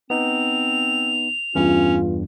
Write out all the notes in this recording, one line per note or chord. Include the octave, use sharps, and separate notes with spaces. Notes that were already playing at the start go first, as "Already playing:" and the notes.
B3 C4 D#4 F7
E2 G2 C#4 F4